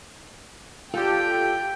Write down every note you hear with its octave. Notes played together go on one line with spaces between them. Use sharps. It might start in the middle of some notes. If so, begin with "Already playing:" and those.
F4 G4 A4 D5 G5